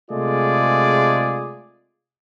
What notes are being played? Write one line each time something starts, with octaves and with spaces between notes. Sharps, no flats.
C3 G#3 A3 F4 G#4 D5